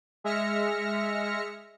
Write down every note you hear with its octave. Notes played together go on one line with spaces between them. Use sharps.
G#3 E5 F6 A#6 C#7